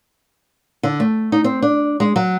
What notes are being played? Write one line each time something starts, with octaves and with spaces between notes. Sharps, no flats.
D3
A3
D#4
C4
D4
G#3
F#3